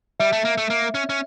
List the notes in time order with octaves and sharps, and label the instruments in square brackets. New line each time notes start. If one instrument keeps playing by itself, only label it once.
[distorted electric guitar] G3 [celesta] E5
[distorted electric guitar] A3
A#3
A3
A#3
C#4
C#4